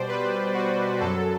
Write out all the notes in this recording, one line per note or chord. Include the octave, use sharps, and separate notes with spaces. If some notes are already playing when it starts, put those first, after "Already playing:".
Already playing: B2 G3 C5 D5
B4
F#4
F#2 F#3 A4